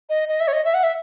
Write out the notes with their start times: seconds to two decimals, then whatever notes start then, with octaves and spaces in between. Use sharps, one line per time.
0.10 D#5
0.29 D#5
0.40 E5
0.48 C#5
0.53 D#5
0.65 E5
0.74 F#5
0.83 E5